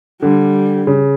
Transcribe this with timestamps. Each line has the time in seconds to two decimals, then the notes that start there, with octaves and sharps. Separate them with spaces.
0.22 D3 G3
0.87 C#3